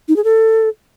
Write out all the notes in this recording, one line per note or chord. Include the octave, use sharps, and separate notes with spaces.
D#4
G#4
A4